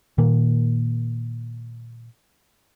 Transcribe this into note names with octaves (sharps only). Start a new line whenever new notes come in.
A#2 D#3 A#3